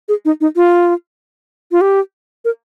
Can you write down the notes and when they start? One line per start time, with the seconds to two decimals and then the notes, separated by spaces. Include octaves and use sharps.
0.09 G#4
0.25 D#4
0.41 D#4
0.56 F4
1.72 F4
1.81 G4
2.45 A#4